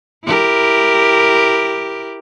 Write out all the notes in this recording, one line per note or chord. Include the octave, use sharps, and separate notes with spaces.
E4 G4 A#4